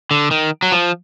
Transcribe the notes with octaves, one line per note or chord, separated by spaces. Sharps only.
D3
D#3
F#3
F3